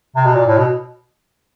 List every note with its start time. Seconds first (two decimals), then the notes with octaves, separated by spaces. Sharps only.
0.16 C3
0.25 B2
0.35 A#2
0.47 A2
0.58 B2